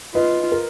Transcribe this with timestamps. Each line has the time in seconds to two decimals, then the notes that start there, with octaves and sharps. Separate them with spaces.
0.15 F4 B4 D#5
0.52 A#4